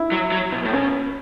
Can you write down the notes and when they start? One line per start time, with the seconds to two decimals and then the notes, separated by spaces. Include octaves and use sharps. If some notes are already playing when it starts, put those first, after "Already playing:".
Already playing: E4
0.12 F#3
0.32 F#3
0.52 B2
0.65 A2
0.73 B2 C#4